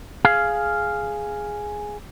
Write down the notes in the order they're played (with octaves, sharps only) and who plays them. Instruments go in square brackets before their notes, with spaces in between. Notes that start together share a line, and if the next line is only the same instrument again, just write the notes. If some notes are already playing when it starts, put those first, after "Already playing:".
[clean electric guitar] G#4 F5